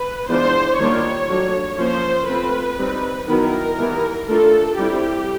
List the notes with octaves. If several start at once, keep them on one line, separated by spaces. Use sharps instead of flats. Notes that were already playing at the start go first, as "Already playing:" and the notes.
Already playing: B4
E3 G#3 B3 D4 F4 C5
D#3 G3 A#3 D4 F4 C#5
F#3 A3 D4
F3 A#3 C#4 C5
A3 C4 F4 B4
G3 C4 D#4
D#3 F#3 B3 E4 A#4
E3 G3 B3 E4
A3 D4 F4 A4
G3 C4 E4 G4